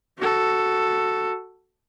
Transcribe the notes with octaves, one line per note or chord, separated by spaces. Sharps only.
F#4 A4